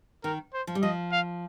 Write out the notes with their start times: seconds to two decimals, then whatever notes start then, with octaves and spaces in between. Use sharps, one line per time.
0.24 D#3 A#4
0.54 C5
0.67 F3
0.75 G3
0.83 F3 D#5
1.12 F5